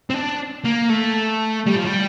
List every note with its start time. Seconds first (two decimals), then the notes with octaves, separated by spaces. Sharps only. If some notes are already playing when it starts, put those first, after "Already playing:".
0.10 C4
0.14 D4
0.65 A#3
0.90 A3
1.66 G3
1.76 F3
1.85 G3